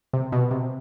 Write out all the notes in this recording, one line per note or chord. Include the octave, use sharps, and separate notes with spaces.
C3
B2
C3